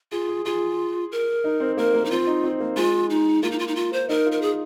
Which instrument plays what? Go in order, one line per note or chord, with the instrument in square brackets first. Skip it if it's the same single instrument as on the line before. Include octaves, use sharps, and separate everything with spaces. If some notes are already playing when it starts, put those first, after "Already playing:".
[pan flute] F4 [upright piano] G#4
[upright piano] G#4
[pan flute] F4 [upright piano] G#4
[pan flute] A#4
[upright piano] D#4
C4
[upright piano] A#3 [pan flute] A#4
[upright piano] A#3
[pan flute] D#4
[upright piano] C4 [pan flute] F4
[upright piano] D#4
C4
A#3
[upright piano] G#3 [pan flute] F4
[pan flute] D#4
[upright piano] A#3 [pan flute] F4
[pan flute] D#4
F4
D#4
F4
C5
[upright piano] D#4 [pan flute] A#4
[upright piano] F4
[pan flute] A#4
G#4